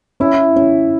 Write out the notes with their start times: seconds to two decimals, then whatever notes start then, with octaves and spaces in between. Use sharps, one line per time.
0.20 C#4 E4
0.56 C#4